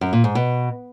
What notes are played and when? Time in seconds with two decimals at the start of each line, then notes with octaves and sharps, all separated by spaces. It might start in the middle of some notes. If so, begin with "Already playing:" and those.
0.01 F#2
0.13 A#2
0.24 G#2
0.35 B2